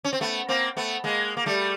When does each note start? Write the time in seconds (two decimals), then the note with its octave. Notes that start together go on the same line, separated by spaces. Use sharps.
0.04 C#4
0.13 C4
0.21 A3 B3
0.49 A#3 C4
0.77 A3 B3
1.04 G#3 A#3
1.37 A#3
1.46 G3 A3